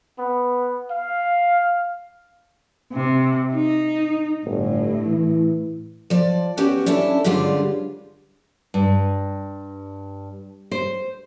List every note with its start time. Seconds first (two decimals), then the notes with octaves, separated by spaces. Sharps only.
0.19 B3
0.91 F5
2.93 C3
3.54 D#4
4.45 G1 A2
5.06 E3
6.10 F3 D5
6.57 B3 C#4 F#4 G4
6.86 C#4 D4 E4 A4
7.24 G2 D3 G3 G#3 C#4 F4
8.74 G2
10.71 C5